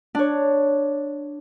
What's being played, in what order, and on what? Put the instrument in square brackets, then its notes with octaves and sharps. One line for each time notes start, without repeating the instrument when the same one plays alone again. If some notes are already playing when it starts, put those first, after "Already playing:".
[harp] D4 C#5